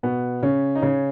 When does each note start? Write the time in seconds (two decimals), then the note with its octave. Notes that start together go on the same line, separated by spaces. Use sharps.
0.03 B2 B3
0.42 C#3 C#4
0.75 D#4
0.82 C#3 C#4